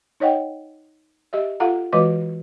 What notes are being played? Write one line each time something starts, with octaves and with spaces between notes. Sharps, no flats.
D#4 C#5 D#5 F#5 G5
G4 D#5 E5
F4 A4 F5 F#5 A#5
E3 G#3 F#4 B4 D#5 D6